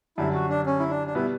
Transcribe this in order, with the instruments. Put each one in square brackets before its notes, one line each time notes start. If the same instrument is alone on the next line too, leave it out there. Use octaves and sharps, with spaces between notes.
[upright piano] F#2 D3 G3 [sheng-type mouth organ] E4
[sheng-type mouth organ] F#4
D4
C#4
E4
D4
D4
[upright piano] B2 G3 B3 [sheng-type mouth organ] E4